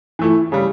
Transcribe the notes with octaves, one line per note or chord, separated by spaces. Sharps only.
E3 A3 E4
C#3 G3